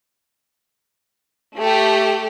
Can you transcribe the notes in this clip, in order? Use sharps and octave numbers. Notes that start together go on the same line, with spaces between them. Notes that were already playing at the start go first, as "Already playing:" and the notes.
A3 G4